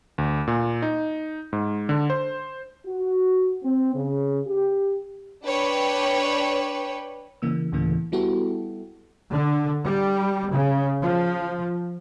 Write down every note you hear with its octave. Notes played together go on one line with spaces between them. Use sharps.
D2
A#2
D#4
G#2
D3
C5
F#4
C4
C#3
G4
D4 B4 C#5 G5
C#3 E3 A#3 E6
D2 A2 C#3 E3 A#3
G3 B3 E4 F#4 G4 A4
D3
G3
C#3
F3